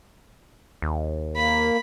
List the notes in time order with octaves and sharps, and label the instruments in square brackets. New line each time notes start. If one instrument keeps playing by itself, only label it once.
[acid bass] D#2
[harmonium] A#3 [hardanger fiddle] B5